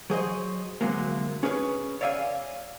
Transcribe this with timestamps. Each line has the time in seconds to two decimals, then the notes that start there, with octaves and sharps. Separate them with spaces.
0.10 F#3 G#4 C5 D#5
0.81 D2 G2 C3 F#3 G#3 A#3
1.43 C#4 G#4 A#4 B4 C#5
2.01 C#5 D5 E5 F5 G5 G#5